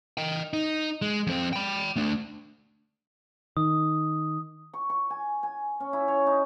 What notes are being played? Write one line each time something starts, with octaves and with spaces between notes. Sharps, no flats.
D#5 G5
D#4
G#3
F2 C4
G5 B5
A3 D4
D#3 D#6
C#6
C#6
G#5
G#5
C#4
E4
C#5
D#4